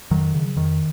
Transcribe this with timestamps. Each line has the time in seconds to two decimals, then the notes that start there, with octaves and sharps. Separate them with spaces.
0.11 F2 D#3 F#3
0.34 C#3
0.56 F2 D#3